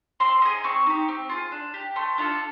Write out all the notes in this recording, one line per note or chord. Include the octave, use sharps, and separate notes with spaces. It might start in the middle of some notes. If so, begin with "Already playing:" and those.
C4 C6
D#4 G#4
C4 C#6
D#4 G4
C4
F4 G#4
D4
G4
A3 C6
D4 F4 A4